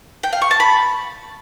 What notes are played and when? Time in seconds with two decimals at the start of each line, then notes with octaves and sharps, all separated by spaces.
0.23 G5
0.33 F5
0.42 C#6
0.51 A5
0.60 B5